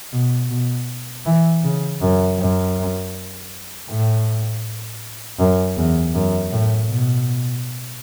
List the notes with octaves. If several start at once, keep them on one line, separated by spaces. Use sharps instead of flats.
B2
B2
E3
C#3
F#2
F#2
A2
F#2
E2
F#2
A2
B2